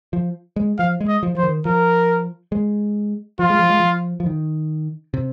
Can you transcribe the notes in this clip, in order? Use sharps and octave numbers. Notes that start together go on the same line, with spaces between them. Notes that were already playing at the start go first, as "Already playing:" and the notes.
F3
G#3
F3 F5
G#3
D#5
F3
F3 C5
D#3
F3 A#4
G#3
F3 F4
G#3
F3
G#3
F3
F3
D#3
C3